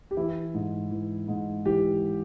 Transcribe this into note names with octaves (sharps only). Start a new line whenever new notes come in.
G4
E3 E4
G#2
E3
G#2
E3 G4